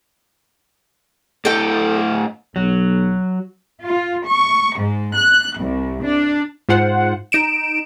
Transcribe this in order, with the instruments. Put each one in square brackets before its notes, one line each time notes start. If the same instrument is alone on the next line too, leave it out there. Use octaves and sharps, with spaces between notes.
[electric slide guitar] A2 E4 D#5 [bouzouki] A4 G5
[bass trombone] B1 [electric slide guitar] F#3
[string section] F4
C#6
G#2
F#6
C2
D4
[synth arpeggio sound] G#2 F4 C5 F#5
D#4 D7 E7